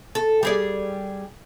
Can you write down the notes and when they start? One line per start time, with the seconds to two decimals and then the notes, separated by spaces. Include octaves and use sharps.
0.15 A4
0.43 G3 G#4 D5